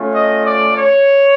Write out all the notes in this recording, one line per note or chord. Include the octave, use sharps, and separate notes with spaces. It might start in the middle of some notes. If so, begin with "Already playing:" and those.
Already playing: A3 C#4 F4
D#5
D5
C#5